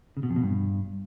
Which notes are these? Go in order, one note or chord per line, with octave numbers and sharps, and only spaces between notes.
C#3
B2
F2
B2
G2